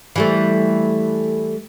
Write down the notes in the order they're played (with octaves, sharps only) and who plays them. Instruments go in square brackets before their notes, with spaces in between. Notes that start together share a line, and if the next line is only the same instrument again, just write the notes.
[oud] E3 G3 A3